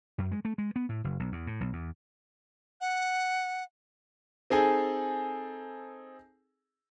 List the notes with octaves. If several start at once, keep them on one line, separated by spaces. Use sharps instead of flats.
F#2
G#3
A3
G#3
B3
A2
F#1
B1
E2
A2
B1
E2
F#5
C4 D#4 G#4 A4 G#5